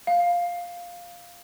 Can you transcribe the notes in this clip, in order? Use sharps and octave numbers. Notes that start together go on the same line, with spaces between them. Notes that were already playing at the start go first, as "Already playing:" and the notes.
F5